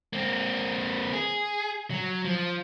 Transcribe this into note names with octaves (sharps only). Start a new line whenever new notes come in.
A#3 C4
G#4
F#3
F3